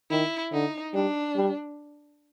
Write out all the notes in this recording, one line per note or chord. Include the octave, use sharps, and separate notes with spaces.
D#3 E4
D3 D#4
G3 D4
G3